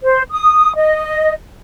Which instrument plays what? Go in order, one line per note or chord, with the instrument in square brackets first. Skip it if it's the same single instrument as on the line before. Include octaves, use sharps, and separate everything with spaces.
[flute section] C5
D#6
D#5